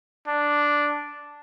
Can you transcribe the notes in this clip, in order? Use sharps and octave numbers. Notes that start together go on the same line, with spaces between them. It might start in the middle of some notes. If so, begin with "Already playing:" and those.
D4